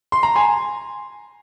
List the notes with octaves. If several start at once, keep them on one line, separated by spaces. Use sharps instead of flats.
C6
A#5
G#5 C6